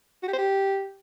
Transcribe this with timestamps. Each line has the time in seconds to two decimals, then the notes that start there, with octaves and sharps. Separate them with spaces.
0.23 F#4
0.28 G4
0.33 C5
0.38 G4